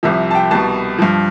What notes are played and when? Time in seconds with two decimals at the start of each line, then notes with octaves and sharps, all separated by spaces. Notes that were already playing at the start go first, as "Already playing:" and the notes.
0.03 C2 C3 F3 E5
0.31 A5
0.35 G5
0.51 C2 B2 A5
0.98 G2 F3